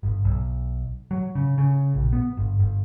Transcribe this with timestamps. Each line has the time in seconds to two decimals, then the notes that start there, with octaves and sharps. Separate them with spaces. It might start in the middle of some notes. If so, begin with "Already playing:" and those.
0.03 G1
0.25 B1
1.11 F#3
1.35 C#3
1.58 C#3
1.94 A#1
2.13 B3
2.37 G1
2.59 G1